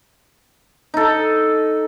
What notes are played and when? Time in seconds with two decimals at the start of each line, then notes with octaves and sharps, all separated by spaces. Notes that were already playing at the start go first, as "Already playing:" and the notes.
0.94 D#4 A4